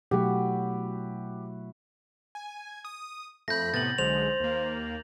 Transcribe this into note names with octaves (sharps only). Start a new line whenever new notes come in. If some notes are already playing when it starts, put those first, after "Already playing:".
B2 F#3 A3 E4 F#4 G4
G#5
D#6
F2 A3 B5 G6 A#6
A2 C3 B3 A6 F#7
B1 D3 G#3 C5 F7
D#2 A#3